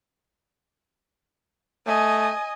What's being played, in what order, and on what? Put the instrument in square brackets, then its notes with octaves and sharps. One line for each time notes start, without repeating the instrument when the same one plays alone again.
[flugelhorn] A3 [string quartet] D#5 G#5